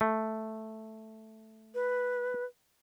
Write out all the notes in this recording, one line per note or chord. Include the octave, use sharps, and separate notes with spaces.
A3
B4